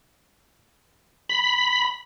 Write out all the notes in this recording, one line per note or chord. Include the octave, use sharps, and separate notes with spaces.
B5